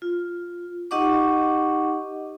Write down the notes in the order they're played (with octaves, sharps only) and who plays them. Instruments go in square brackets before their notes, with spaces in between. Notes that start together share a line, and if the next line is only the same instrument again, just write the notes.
[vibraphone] F4
D#4 G4 D#5 F#5 C#6 D6